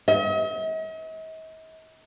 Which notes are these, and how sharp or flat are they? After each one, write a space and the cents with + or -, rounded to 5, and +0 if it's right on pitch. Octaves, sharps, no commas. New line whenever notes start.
D#5 +45